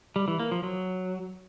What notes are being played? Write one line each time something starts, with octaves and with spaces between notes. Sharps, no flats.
G3
E3
A#3
F3
F#3